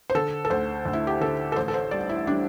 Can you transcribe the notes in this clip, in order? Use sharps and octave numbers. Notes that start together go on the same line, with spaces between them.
C5
D3 A4
A4
D2 C5
D2
E4
G4
D3 A4
A4
A1 C5
A4
C5
G3 D5
E4
G3 D4